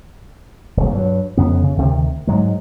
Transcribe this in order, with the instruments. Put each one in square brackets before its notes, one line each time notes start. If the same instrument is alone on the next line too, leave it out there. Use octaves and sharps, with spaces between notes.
[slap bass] D#1 C2
G2 F#3
F2 C#3 B3
C#3
D2 C3 D#3
G#2 F#3 G#3